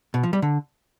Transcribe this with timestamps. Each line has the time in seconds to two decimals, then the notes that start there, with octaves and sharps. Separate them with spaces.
0.14 B2
0.23 F3
0.33 G3
0.42 D3